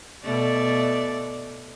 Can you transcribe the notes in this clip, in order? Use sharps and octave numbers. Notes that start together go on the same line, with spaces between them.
B2 A3 D5